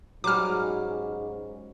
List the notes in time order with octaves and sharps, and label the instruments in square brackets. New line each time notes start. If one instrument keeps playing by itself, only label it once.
[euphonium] G#2 [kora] F#3 G3 C#4 [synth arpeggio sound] D6 F6